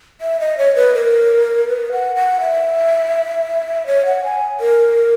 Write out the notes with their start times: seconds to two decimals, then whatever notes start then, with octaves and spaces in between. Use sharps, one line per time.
0.21 E5
0.40 D#5
0.58 C#5
0.75 B4
0.94 A#4
1.68 B4
1.92 F#5
2.16 F#5
2.41 E5
3.87 C#5
4.06 F#5
4.24 G#5
4.60 A#4